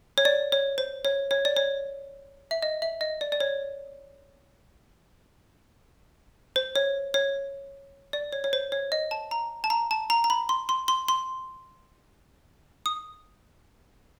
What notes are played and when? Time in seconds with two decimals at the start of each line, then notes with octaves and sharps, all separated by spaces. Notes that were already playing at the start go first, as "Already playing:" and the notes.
0.18 C#5
0.25 D5
0.52 C#5
0.78 C5
1.05 C#5
1.31 C#5
1.45 D5
1.57 C#5
2.51 E5
2.63 D#5
2.82 E5
3.01 D#5
3.21 D5
3.32 D5
3.40 C#5
6.56 C5
6.76 C#5
7.14 C#5
8.13 D5
8.33 C#5
8.44 C#5
8.53 C5
8.72 C#5
8.92 D#5
9.11 A5
9.31 A#5
9.64 A5
9.70 A#5
9.91 A5
10.10 A#5
10.24 A#5
10.30 B5
10.49 C6
10.69 C6
10.88 C6
11.08 C6
12.86 D#6